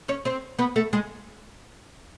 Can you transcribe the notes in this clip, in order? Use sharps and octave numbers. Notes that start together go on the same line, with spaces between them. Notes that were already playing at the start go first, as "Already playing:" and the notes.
C#4 C#5
C4 C5
B3 B4
A3 A4
G#3 G#4